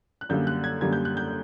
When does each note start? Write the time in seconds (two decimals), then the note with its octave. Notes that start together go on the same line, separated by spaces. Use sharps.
0.21 F#6
0.29 F#2 D3 G3 A#3 G6
0.47 F#6
0.64 G#6
0.81 F#2 D3 G3 A#3 G#6
0.93 G6
1.05 F#6
1.17 G6